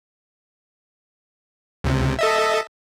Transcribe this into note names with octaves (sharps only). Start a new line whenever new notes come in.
C#2 C3
A4 D#5 E5